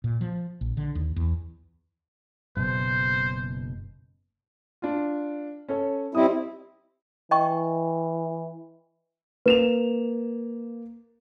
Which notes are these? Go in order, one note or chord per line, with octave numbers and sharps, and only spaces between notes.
A#2
F3
A#1
D3
D#2
E2
F#1 B2 C5
D4 F4
C#4 A4 C#5
G3 C4 E4 D#5 D#6
E3 D#5 G5 C#6
A#3 B4 E7 F7